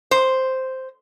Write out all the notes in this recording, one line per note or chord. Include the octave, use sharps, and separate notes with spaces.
C5